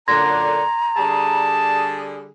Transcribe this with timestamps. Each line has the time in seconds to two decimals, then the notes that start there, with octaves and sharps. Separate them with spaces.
0.08 F#2 A#2 D3 A#5 C6 G#6 A#6
0.97 D3 G3 G#4 A5